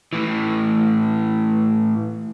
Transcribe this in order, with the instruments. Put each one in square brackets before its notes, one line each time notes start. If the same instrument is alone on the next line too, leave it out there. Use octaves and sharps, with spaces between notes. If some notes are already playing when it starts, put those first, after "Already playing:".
[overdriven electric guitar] A2 E3